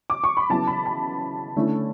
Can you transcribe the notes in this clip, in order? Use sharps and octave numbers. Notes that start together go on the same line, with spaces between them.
D6
C#6
B5
C#3 F#3 B3 E4 A5
B5
A5
D3 A3 C#4 E4